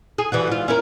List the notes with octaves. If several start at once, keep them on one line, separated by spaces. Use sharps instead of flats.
G#4
E3 G3 F#4
G#2 F4
C#4 E4 A#4